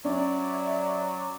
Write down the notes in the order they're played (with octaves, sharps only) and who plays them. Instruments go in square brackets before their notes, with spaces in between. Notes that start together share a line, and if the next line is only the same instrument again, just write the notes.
[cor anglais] F#3 [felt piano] C#4 [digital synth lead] D5 [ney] E5